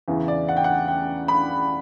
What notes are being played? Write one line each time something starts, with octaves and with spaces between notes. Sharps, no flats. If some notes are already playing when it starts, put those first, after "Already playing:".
E2 C#3 E3
D5
F#5
G5
F#5
G5
B5